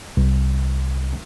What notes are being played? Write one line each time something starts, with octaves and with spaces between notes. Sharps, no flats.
C2